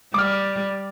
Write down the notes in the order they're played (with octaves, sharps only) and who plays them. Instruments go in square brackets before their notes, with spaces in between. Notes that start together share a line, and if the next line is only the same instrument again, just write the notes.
[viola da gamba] G3 [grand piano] D6 F6